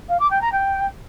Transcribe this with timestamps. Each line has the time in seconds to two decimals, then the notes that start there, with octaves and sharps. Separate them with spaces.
0.09 F5
0.20 D6
0.31 G5
0.41 A#5
0.52 G5